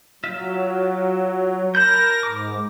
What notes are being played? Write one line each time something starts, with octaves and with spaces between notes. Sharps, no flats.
F#3 F4 E5
A#4 A5 B5 G6 A#6
G#2 D6